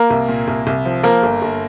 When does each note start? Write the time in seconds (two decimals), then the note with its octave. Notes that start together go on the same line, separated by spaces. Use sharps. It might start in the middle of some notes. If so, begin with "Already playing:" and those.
Already playing: A#3 A#4
0.10 C2
0.29 A#2
0.48 C2
0.67 C2
0.85 F3
1.03 F3 A#3 A#4
1.23 G1
1.42 G1